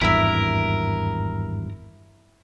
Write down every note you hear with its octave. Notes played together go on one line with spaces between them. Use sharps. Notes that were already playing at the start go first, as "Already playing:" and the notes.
G#1 E2 G2 E4 A#4 E5